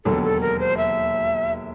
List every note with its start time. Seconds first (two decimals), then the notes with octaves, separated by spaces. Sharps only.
0.05 E1 D#2 D3 F#3 A4
0.23 A4
0.41 A#4
0.60 C5
0.77 E5